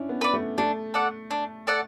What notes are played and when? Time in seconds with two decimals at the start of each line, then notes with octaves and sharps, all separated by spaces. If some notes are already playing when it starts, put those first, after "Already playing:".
Already playing: C#4 D4 E4
0.09 B3
0.21 B4 D5
0.34 A3
0.58 A3 D4
0.94 A4 D5 F#5
1.31 D4
1.67 A4 D5 F#5